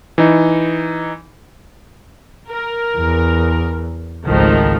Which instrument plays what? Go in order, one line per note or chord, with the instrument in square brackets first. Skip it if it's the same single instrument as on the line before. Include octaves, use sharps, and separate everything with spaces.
[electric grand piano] E3 D#4
[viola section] A#4
[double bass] E2
[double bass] G#1 C#2 [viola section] D#3 F3 A3